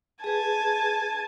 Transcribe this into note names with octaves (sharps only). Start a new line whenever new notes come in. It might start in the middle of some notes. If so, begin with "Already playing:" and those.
G#4 B4 G#5 A5